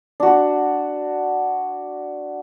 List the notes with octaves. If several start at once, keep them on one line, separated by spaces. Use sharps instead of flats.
D4 F#4